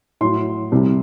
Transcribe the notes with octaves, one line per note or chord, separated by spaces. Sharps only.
A2 F#3 C6
C2 C3 G3